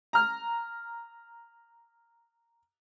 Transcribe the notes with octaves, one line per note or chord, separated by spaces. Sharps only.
A#5 F6